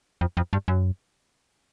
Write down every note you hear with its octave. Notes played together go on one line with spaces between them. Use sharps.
F2
F2
G2
F#2